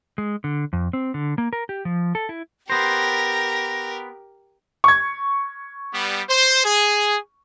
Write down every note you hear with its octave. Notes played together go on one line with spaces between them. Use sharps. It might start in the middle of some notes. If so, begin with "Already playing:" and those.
G#3
D3
F2
C4
D3
A#3
A#4
G4
F3
A4
E4
B3 G4 A#4 C5 A#6
C#6 G#6
G3 B3
C5
G#4